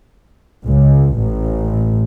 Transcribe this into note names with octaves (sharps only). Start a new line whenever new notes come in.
C#2
A1